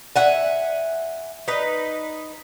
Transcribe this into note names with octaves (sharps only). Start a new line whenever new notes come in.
E5 F#5 G#5
D#4 B4